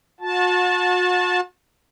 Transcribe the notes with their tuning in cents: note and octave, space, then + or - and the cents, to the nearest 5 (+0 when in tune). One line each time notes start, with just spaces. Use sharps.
F#4 -45 A5 -10